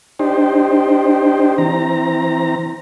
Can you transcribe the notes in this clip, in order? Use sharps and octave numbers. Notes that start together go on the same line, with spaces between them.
D4 D#4 G4 C5
E3 C4 A#5